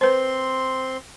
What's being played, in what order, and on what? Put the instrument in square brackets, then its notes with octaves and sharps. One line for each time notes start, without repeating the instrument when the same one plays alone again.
[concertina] C4 C6 [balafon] B4 C5